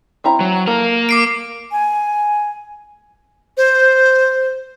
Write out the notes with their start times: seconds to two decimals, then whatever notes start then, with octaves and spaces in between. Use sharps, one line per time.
0.24 C4 E4 A#5
0.40 F#3
0.67 A#3 A4 A#4
1.09 D6 C7 D7
1.72 G#5
3.57 C5